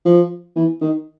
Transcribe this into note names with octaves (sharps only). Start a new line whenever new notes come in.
F3
E3
D#3